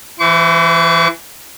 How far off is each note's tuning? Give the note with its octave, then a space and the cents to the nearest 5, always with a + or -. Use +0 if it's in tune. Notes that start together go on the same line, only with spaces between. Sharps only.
E3 +20 C5 -30 C#6 +45